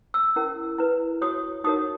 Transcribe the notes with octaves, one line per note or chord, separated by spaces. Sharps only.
E6
C#4 E4 A#4
E4 B4
F#4 C#5 D#6
D#4 F#4 A#4 C#5 D#6